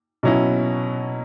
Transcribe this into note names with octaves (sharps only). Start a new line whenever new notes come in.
B2 F#3 C#4 E4